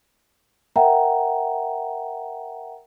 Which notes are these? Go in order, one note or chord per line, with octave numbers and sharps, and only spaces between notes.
A#4 E5 F#5 G5 A#5